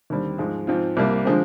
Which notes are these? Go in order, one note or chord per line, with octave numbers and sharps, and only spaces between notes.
D#2 D3 G3 C4
G#2 F3 G#3
G#2 F3 C4 F4
C2 C3 G3 A#3
D3 F3 G#3 C4